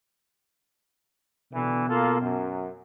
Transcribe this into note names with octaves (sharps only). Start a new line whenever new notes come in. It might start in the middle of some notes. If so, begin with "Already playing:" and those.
B2 D3 E3
A#3 F4 A4
F#2